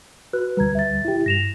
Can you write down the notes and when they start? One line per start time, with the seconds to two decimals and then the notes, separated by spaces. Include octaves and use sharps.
0.33 F#4 B4 F#6
0.57 D2 G3 B4 A#5 G#6
0.75 E5 A6
1.05 E4 G4
1.26 G2 A#6 E7 F7